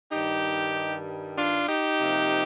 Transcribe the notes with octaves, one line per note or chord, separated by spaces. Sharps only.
G2 D#3 G3 D#4 G4
D4 F4
D#4 G4
C3 F3 A#3